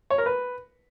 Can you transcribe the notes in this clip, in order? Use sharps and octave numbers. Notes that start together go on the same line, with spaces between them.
C#5
A#4
B4